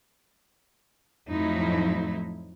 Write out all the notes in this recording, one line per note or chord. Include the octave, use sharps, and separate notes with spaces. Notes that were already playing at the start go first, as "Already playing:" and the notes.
F2 A2 F3 F#3 D#4 E4